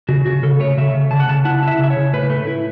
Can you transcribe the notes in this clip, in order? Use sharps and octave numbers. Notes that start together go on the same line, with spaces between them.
C#3 F#4
C#3 F#4
C#3 A4
A3 C#5
C#3 E5
C#3
C#3 A5
F#5
C#3 A5
E4 F#5
E4 E5
C#3 E5
C#5
C#3
A2 B4
A3
E4